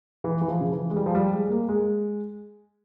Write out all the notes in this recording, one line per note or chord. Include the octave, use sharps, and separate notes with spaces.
E3
E3
F3
C#3
E3
G#3
G3
F3
G3
G#3
G#3
A#3
G#3